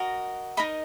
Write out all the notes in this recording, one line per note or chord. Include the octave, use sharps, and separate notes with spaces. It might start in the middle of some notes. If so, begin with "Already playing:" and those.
Already playing: F#4 A#4 D#5
D#4 A#4 D#5 B5